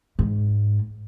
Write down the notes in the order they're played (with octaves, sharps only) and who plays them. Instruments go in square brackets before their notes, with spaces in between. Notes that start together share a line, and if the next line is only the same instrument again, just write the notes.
[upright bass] G#2